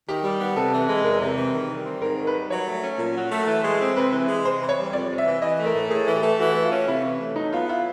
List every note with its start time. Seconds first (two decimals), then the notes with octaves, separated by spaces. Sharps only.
0.08 D#3 G4
0.24 G3
0.41 B3
0.56 C3 A4
0.73 E3
0.89 G#3
1.04 E2 A#4
1.21 C3
1.37 E3
1.54 D#3
1.70 G3
1.86 C4
2.02 G#2 A#4
2.18 D#3
2.27 B4
2.35 G3
2.50 F#3 C#5
2.67 A3
2.83 C#4
2.99 A#2
3.16 F#3
3.32 A3
3.47 E3
3.64 G#3
3.80 C4
3.96 C3 B4
4.13 E3
4.28 G#3
4.45 C3 C5
4.62 E3
4.69 C#5
4.78 G3
4.93 F2 D5
5.10 C3
5.18 E5
5.26 E3
5.42 E3 D#5
5.59 A3
5.66 A#4
5.75 A2
5.90 A2 G#4
6.07 E3
6.15 G4
6.23 A3
6.39 E3 F#4
6.55 A3
6.64 F4
6.72 C#4
6.87 C3 E4
7.03 E3
7.20 A3
7.36 F#3 D#4
7.53 B3 F4
7.69 E4 F4